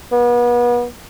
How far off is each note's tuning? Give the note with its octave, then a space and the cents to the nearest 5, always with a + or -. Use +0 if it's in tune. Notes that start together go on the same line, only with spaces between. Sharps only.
B3 -35